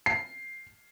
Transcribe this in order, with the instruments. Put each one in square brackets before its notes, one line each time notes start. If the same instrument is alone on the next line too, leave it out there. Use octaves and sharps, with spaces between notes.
[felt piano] C7